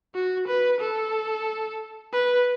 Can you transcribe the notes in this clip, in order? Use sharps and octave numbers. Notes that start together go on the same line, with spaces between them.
F#4
B4
A4
B4